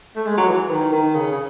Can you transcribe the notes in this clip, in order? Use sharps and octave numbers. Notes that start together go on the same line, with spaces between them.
A3
G#3
F#3
E3
D#3
D#3
C#3
C#3